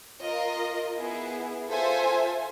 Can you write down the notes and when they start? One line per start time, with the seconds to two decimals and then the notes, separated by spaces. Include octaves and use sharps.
0.22 F4 A#4 D#5
0.95 B3 E4 G#4
1.68 F4 A4 C5 E5 G#5